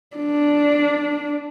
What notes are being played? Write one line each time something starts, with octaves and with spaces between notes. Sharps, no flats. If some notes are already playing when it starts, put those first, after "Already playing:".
D4